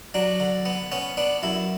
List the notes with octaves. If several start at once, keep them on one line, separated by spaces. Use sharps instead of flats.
F#3 D4
D3
B3
B3 C#4
B3 D4
F#2 E4